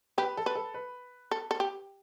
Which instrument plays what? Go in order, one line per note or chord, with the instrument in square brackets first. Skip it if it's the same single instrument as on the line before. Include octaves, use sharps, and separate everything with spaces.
[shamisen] G4 [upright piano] B4
[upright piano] A4
[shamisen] B4
[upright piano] A4
B4
[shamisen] A4
A4
G4